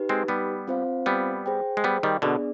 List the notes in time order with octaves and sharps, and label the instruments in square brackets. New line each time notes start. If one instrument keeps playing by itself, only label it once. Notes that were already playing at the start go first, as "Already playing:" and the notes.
Already playing: [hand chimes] D#4 G4 B4
[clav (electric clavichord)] G#3 C4
G3 B3
[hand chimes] C4 F4 C5 F5
[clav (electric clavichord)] G3 B3
[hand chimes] G#4 C5 G5
[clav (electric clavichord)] G#3
G3 B3
D#3 G3
[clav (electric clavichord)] B2 D3 [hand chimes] B3 D4 G#4 D5